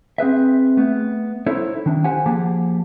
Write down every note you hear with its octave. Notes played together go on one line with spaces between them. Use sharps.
C4 G#4 B4 E5
A3 B3
D#4 E4 A4 C5 C#5
D#3 D4
G4 C5 F#5 G#5
F3 A#3 G4 G#4 A5